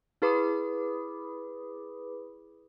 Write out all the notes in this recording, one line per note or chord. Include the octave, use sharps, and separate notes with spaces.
E4 G#4 B4 B5 D6 D#6